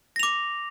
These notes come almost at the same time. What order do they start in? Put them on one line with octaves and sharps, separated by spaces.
A#6 F7 D6